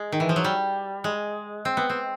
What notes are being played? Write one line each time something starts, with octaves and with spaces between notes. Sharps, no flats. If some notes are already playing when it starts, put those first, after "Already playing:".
Already playing: G#3
D#3
E3
F3
F#3
G3
G#3
C4
B3
C4